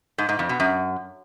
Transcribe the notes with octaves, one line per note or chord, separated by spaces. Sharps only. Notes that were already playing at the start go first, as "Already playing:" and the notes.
G#2
G#2
F2
B2
F#2